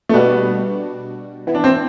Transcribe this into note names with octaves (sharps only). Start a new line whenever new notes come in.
A3
B2 G3 B3 D4 F#4
E3 B3 E4
D4
C4